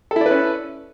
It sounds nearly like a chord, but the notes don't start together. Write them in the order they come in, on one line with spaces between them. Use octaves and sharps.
A4 E4 D5 B4 C#4